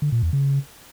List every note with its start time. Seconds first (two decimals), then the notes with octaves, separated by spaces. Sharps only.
0.02 D3
0.12 A#2
0.23 E2
0.33 C#3